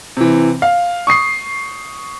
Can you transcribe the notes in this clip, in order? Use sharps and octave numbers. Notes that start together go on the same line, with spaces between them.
C3 E3
F5
C#6 D#6 C7